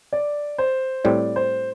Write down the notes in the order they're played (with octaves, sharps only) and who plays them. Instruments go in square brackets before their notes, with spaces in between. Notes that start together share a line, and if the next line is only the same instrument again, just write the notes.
[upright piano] D5
C5
[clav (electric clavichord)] A2 G3 C4 [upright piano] D5
[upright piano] C5